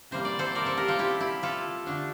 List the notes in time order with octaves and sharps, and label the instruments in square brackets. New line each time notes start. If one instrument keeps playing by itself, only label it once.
[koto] C3 E3 G3 A#3 C5
D5
A4 C5
A#4 D5
A4 C5
G4 A#4
F4 A4
E4 G4
E4 G4
F4 A4
D3 A3 D4